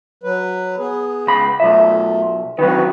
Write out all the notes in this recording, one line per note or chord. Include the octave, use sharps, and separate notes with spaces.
F#3 B4
B3 G#4
C#2 B5
B1 A3 F4 E5
D#3 E3 F#3 C4 F#4 B4